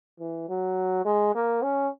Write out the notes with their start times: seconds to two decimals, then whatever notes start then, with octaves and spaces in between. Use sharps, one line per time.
0.19 E3
0.49 F#3
1.05 G#3
1.35 A#3
1.62 C#4